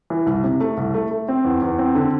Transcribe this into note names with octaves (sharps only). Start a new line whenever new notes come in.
E3
C2
C3
A3
C2
A3
A3
C4
E2
E2
C4
D3